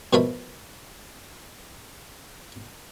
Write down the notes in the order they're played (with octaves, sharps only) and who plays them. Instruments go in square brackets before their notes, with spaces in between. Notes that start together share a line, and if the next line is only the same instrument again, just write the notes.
[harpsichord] B2 F3 F4 A#4 E5 B5